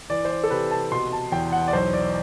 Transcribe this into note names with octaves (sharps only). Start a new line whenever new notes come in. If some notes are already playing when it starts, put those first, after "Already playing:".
E3 D5
C5
D5
A4
C3 B4
A5
B2 C6
A5
E2 G5
F#5
D5
B1 C5
D5